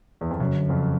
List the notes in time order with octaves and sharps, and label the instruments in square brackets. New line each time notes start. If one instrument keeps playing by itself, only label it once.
[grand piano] E2
F2
[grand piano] F#2 [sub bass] C3
[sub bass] C#3
D3
[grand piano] F2 [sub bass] C#3